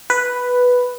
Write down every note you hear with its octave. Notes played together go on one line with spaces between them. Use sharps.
B4